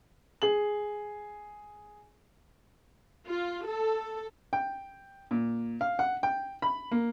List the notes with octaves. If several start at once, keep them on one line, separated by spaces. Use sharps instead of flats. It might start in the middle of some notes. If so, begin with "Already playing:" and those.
G#4 F#7
F4
A4
G5
A#2
F5
F#5
G5
B5
A#3